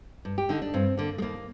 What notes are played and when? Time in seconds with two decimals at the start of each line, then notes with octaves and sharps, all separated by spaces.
0.25 G2
0.38 G4
0.49 D3 D#4
0.62 D4
0.74 G2 C4
0.97 D3 A#3
1.18 G#3
1.22 D#2 A#3